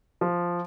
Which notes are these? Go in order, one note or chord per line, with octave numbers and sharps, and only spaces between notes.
F3